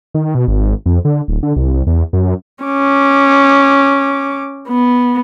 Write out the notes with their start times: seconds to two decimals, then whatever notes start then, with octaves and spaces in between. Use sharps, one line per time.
0.14 D#3
0.35 B2
0.48 G#1
0.86 F2
1.05 D3
1.28 D1
1.43 D3
1.56 C2
1.73 C2
1.87 E2
2.13 F#2
2.64 C#4 D6
4.69 B3